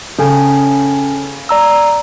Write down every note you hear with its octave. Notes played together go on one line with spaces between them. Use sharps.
C#3 C#4 A4 G#5
D5 A#5 E6